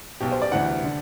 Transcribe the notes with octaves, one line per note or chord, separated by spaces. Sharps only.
B1 B2 G4
C5
D5
D2 C3 E3 F#5
D3